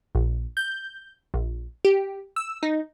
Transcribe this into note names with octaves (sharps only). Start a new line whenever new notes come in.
A#1
G6
A#1
G4
E6
D#4